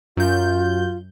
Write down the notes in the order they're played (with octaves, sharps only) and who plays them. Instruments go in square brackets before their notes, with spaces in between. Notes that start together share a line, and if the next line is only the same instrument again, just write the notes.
[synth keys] F#2 G6 [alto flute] F4